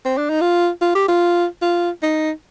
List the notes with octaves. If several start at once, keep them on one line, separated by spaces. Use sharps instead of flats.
C4
D4
D#4
F4
F4
G4
F4
F4
D#4